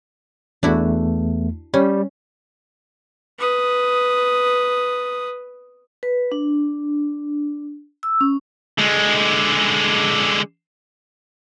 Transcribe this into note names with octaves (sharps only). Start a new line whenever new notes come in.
E2 A3 D4 E4 F#4
G3 C#4
B4 D#6
B4
D4
E6
C#4
D3 G#3